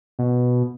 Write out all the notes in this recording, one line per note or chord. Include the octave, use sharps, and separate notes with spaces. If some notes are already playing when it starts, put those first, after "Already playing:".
B2